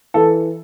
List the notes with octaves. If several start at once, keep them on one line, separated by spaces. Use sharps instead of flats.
E3 A4